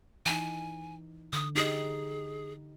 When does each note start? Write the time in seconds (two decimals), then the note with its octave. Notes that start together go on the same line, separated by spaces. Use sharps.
0.26 E3 D#4 G#5
1.33 D3 D#6
1.55 D#4 G4 G#4 D#5